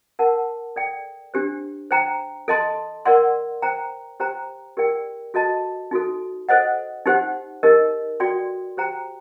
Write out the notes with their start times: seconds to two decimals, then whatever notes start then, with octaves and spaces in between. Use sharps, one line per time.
0.19 A#4 F#5 A5
0.76 A4 D5 G5
1.34 D4 G4 C5
1.91 C5 G5 A#5
2.48 A4 D#5 A5 C6
3.05 A#4 D5 F#5 C6
3.62 C5 G5 A#5
4.20 G4 C5 G5 A#5
4.77 G4 A#4 D5 G5
5.34 F#4 A4 D#5 A5
5.91 D#4 F#4 A4
6.49 A4 C5 D#5 F#5
7.06 D#4 G4 C5 F#5
7.63 D#4 G4 A#4 D#5
8.20 F#4 A4 D5 G5 C6
8.77 G4 C5 G5 A#5